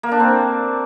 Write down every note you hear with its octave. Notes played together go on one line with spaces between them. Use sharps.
A#3
D4
C4